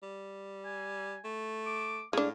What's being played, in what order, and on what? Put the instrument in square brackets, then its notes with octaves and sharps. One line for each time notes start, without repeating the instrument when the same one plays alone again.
[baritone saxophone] G3
[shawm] G#5
[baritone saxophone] A3
[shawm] D6
[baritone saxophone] A2 [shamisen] G#3 D4 [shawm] F5